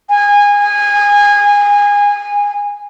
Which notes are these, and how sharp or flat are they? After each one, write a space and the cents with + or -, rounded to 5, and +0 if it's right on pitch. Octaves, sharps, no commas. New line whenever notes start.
G#5 -20